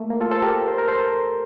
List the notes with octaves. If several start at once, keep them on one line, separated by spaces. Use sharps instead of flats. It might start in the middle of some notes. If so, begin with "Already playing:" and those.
Already playing: A3 A#3
A#3
F4 A4
A4 C5
G4 A#4
C5
A#4
A4 C5